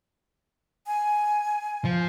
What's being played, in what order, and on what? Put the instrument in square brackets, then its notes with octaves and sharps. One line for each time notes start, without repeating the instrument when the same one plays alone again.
[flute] G#5
[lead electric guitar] F3